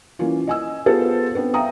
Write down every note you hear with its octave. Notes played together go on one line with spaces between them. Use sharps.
E3 A#3 C#4 F4
D#5 G#5 E6
B3 F4 G#4 A4 C5 F5
B3 C4 D4
E5 F5 G5 A#5 D#6